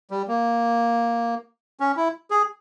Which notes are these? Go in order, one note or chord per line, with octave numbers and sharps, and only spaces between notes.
G3
A#3
C#4
E4
G#4